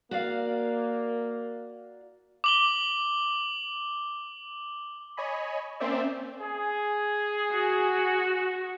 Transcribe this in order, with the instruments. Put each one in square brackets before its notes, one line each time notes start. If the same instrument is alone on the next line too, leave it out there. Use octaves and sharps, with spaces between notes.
[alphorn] A#3 [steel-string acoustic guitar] F#4 D5 F5
[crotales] D6 F#7 G7
[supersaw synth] C#5 D#5 G#5 B5
A#3 C4 C#4 C5 D5 E5
[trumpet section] G#4
[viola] F#4